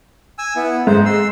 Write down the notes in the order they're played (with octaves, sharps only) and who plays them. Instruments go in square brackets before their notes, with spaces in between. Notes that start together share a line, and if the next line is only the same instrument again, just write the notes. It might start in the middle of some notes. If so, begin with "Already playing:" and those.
[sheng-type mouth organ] G#5 E6
B3 E4
[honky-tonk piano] G#2 [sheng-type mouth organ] C5
[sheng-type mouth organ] C6 E6